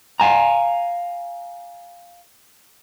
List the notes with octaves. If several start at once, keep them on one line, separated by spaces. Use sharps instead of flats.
F5 G#5 A#5